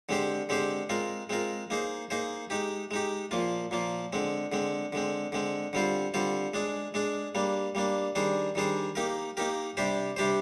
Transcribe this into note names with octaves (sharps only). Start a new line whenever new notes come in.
D3 G#3 C4 G4 C5
D3 G#3 C4 G4 C5
G#3 C4 F4 A#4
G#3 C4 F4 A#4
A#3 D#4 G#4 C5
A#3 D#4 G#4 C5
G#3 D#4 G4
G#3 D#4 G4
A#2 F3 A#3 F4
A#2 F3 A#3 F4
D3 G#3 C4
D3 G#3 C4
D3 G#3 C4
D3 G#3 C4
D3 G3 C4 F4 C5
D3 G3 C4 F4 C5
G#3 D4 G#4
G#3 D4 G#4
G3 A#3 D4
G3 A#3 D4
D#3 G3 D4 G#4 C5
D#3 G3 D4 G#4 C5
A#3 D#4 G4 A#4
A#3 D#4 G4 A#4
C3 G3 D4 G4 C5
C3 G3 D4 G4 C5